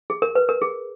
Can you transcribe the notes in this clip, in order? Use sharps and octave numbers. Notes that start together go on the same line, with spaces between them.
G#4
A#4
B4
A#4
G#4